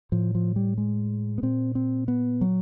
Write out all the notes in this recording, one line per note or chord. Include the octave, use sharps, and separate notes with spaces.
A2 F3
F3
G3
G#3
B3
A#2 C4
C4
B3
F#3